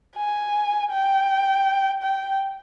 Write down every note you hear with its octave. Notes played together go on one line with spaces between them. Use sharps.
G#5
G5
G5